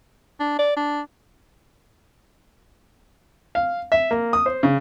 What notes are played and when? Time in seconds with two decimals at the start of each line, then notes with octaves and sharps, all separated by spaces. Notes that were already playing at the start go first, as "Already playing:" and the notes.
0.40 D4
0.59 D5
0.76 D4
3.55 F5
3.92 E5
4.11 A#3
4.33 D#6
4.46 C5
4.63 C#3